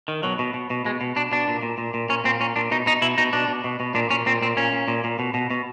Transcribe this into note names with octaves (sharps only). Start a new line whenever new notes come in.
D#3
B2 F#3
B2
B2
B2
B2 G#3
B2
B2 D4
B2 D4
A#2
A#2
A#2
A#2
A#2 C#4
A#2 C4
A#2 C#4
A#2 D4
B2 D#4
B2 D#4
B2 E4
B2 D#4
B2 D4
B2
B2
B2
A#2 D4
A#2 C#4
A#2 C4
A#2 C4
A#2 C#4
A#2
A#2
A#2
B2
B2
B2